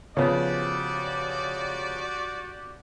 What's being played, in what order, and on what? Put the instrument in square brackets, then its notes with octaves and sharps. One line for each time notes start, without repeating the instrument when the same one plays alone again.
[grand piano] C#3 F3 B3 [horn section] F#4 G4 D5